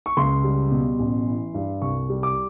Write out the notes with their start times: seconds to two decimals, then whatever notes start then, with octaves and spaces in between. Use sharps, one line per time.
0.06 C#6
0.17 C#2 C6
0.44 G3
0.71 B2
0.99 A1
1.27 E3
1.54 G2
1.82 C2 C#6
2.10 G3
2.23 D6